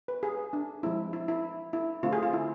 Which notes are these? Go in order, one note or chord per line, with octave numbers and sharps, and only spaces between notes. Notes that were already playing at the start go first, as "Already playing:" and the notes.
B4
G#4
D4
F3 G#3 C4 E4
E4
E4
E4
D3 A3 C4 F4
G#4
F4
E4